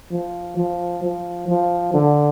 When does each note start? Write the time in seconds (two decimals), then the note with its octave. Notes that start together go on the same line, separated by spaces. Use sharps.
0.12 F3
0.57 F3
1.03 F3
1.48 F3
1.94 D3